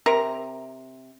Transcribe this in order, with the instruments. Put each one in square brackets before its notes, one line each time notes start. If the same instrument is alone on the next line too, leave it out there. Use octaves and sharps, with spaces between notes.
[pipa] C3 A#4 A#5